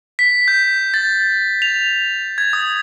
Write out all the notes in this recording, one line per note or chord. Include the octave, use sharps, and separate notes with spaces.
B6
G6
A6
F7
G#6
D#6